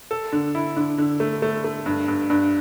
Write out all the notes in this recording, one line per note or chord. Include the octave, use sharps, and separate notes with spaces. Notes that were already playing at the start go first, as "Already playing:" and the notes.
A4
D3
E4
D3
D3
A3
A3
A3
G2
G2
G2